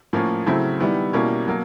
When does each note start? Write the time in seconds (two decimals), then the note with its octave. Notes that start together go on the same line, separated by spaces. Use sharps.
0.13 A2 F3 A#3 C#4
0.46 C#3 F#3 A3 C4 E4
0.80 D#3 G3 B3 E4
1.13 B2 G3 A#3 C#4 E4
1.47 B2 F#3 A#3